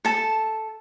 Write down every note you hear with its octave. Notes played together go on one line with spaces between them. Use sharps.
A4 A5